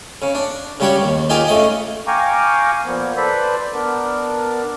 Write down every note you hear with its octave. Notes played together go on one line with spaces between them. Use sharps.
C#3
D4
C#3 G3 F#4 G4 C#5
D#2
D#4 F4 G4 G#4 D5
C#3 A3 D#5 D#6
F5 G5 G#5 A#5 C#6 D6
A#2 F3 A#3 B3
A4 B4 C5 D5 B5
B3 D4 A#4 D5